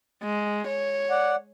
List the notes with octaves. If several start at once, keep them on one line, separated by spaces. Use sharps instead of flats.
G#3
C#5
D5 F#5